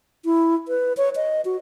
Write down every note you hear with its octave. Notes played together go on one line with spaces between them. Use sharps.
E4
B4
C#5
D#5
F#4